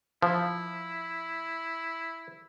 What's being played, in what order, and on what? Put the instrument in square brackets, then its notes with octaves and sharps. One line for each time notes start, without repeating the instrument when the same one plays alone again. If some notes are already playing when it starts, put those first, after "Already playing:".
[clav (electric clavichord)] F3 [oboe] E4